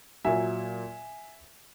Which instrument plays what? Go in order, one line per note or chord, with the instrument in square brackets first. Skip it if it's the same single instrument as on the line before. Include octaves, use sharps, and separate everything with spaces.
[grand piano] A#2 F#3 E5 G#5